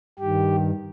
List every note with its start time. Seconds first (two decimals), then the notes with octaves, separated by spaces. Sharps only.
0.19 G2 D#3 G4